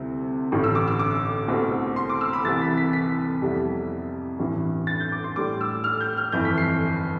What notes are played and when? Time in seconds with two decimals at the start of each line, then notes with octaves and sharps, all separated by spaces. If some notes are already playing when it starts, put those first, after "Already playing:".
Already playing: D2 C3 G3 C4 E4
0.52 A1 G2 D3
0.64 E6
0.75 D6
0.88 E6
0.99 D6
1.48 C2 B2 A3 C4
1.96 C6
2.10 D6
2.21 E6
2.33 B5
2.45 C2 C3 E3 A6
2.61 B6
2.77 B6
2.93 B6
3.42 F2 C3 G3 B3 E4
4.39 A1 G2 E3
4.87 A6
5.00 G6
5.12 D6
5.24 C6
5.36 A2 G3 D4 D6
5.61 E6
5.84 F6
6.01 G6
6.17 F6
6.32 G1 F2 E3 G6
6.45 B6
6.58 C7